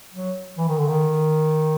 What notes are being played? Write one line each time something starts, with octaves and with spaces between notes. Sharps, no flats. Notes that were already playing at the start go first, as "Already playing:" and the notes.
F#3
E3
D#3
D3
D#3